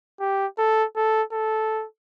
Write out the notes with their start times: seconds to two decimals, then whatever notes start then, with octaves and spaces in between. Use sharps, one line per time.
0.20 G4
0.58 A4
0.96 A4
1.33 A4